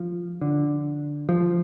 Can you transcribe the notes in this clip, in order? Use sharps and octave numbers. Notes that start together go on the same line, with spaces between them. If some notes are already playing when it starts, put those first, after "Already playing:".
Already playing: F3
D3
F3